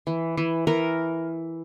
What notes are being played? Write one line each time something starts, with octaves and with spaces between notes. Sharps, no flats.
E3
E3
E3 A#4